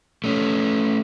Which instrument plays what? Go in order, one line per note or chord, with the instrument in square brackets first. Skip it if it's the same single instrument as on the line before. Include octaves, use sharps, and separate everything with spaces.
[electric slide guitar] A3 C#4